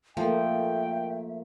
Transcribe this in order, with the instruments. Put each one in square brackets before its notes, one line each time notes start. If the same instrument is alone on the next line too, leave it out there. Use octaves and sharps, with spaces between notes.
[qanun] F3 [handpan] A3 A#3 [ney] E5 [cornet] G5